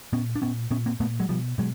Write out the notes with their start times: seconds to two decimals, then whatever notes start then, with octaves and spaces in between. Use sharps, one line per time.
0.13 A#2 B3 C#4
0.36 D4
0.42 A#2 B3 C#4
0.71 A#2 B3 C#4
0.86 A#3 C4
1.00 A#2 A3 B3
1.20 F#3 G#3
1.29 B2 F3 G3
1.58 B2 F#3 G#3